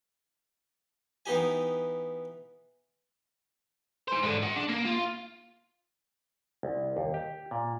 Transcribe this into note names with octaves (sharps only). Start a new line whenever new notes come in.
E3 B3 D#4 G4 G#5
G#4 C5
G#2 D3
G#4 F#5
D4
A#3
F4
C2
D#2
G4
A#2